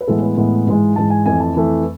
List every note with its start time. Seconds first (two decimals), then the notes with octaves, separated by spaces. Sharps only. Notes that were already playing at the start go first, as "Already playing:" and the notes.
0.01 B4
0.07 A2 E3 G#3 B3 A4
0.22 B4
0.37 A2 E3 G#3 B3
0.67 G#2 E3 G#3
0.96 G#2 E3 G#3 A5
1.10 G#5
1.26 F2 E3 A3 G#5
1.40 A5
1.55 F2 E3 A3